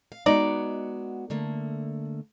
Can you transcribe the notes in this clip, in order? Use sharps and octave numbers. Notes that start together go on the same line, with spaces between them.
F5
G#3 B3 D#4 F#4 D5
D3 A3 A#3